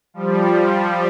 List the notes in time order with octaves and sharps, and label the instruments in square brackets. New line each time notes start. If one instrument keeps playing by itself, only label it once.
[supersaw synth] F3 G3